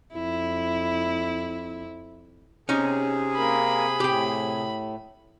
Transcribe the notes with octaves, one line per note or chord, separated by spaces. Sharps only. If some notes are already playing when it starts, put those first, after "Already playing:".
F2 E4
C3 C#4 D#4 G#4
A#3 A#4 B5
A2 G4 G5